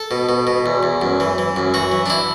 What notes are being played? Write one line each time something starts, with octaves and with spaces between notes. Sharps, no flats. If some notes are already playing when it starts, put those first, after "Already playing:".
Already playing: A4
B2
B2
B2
E2
E2
F#2
E3
E3
F#2
E3 F#4
E3
D4
E4